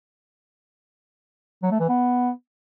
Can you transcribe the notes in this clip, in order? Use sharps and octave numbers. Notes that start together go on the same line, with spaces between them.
F#3
A3
E3
B3